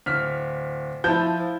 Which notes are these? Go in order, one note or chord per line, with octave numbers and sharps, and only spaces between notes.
D1 F6 B6
F3 E4 A5 G6